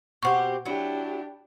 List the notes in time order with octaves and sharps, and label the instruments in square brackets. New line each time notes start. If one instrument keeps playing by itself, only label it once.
[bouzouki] B2 C4 G4 [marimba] F#5 C#6
[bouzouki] F#3 E4 [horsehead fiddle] D4 G4